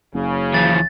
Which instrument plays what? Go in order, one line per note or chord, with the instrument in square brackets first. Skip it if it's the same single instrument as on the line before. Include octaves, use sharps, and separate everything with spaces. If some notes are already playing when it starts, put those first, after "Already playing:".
[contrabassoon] F#1 [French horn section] C#3
[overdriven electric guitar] E3 F3 [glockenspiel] A6